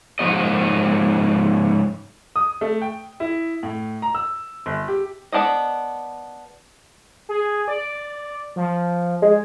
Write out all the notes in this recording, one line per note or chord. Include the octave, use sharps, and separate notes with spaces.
G#2 F3 F#4 D#5
D#6
A3
G5
E4
A2
A#5
E6
G1
G4
B3 D4 C5 D#5
G#4
D5
F3
G#3